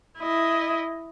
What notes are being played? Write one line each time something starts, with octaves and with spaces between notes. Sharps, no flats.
E4 D#5